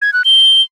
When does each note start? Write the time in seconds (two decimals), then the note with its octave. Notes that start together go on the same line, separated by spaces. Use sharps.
0.02 G#6
0.13 F#6
0.25 G7